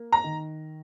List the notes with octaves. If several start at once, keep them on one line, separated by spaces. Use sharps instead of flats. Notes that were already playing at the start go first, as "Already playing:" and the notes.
Already playing: A#3
A#5
D#3